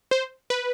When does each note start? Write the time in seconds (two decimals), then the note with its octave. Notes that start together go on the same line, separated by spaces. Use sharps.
0.11 C5
0.50 B4